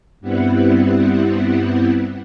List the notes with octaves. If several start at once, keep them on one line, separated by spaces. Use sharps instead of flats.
G2 G3 B3 C4 E4 F#5